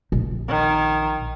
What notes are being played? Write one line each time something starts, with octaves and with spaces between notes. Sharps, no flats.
A#1
D#3